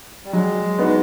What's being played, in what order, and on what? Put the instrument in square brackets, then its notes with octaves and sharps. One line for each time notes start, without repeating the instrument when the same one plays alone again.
[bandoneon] G3
[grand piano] F#3 [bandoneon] G#3
[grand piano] B3 D#4 F#4